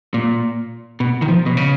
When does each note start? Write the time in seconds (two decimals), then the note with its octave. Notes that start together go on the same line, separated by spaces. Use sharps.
0.14 A#2
1.00 B2
1.22 D#3
1.28 F3
1.46 B2
1.57 C#3